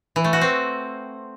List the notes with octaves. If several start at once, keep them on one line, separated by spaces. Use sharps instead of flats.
E3
A3
F#4
C4